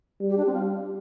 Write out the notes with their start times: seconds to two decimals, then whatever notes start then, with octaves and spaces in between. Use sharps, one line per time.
0.20 G3
0.29 G4
0.37 D4
0.46 C4
0.53 F4